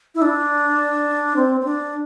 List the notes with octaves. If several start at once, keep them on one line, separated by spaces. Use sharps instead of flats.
E4
D4
C4
C4
D4